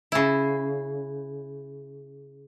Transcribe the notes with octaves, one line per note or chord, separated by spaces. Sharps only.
C#3 E4